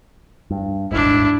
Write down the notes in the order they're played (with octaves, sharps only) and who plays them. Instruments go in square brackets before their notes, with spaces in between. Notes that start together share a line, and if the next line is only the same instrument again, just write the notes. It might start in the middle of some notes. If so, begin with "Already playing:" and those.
[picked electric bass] G2
[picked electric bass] D#1 G#1 G#2 [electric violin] D4 E4